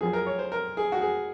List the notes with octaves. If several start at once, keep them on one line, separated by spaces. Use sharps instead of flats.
F#2 F3 G#4
A#4
C#5
C5
A#4
G#4
F#4
G#4